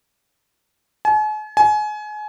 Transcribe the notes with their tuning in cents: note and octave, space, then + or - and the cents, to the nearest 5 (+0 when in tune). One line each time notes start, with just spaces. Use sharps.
G#5 +45
G#5 +30